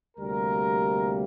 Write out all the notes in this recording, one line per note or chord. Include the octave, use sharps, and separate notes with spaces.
D2 C3 G3 A#3 A#4